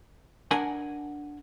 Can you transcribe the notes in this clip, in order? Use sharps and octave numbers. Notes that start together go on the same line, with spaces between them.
D4 A#4 F#5 G#5